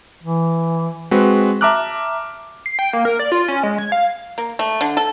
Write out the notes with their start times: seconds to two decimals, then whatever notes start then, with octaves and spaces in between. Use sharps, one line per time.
0.23 E3
1.11 G#3 C4 F#4 B4
1.61 E5 A5 A#5 D6 F6 F#6
2.66 C7
2.79 G5
2.93 A#3
3.05 A#4
3.19 D5
3.32 F4
3.48 C#4
3.63 G#3
3.79 G#6
3.92 F5
4.38 A#3
4.59 A3
4.81 D3
4.97 A4